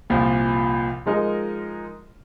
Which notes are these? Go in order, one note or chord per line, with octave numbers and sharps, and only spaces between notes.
C2 A#2 F3
F3 G#3 D#4 A#4